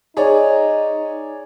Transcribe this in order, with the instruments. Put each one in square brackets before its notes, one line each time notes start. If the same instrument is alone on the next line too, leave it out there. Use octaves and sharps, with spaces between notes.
[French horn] D#4 [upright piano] G#4 C#5 D5